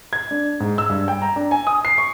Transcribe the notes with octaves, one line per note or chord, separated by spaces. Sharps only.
G#6
D4
G#2
E6
G2
G5
A#5
D4
G#5
D#6
C7
C#6